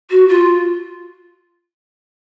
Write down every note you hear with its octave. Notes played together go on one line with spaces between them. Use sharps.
F#4
F4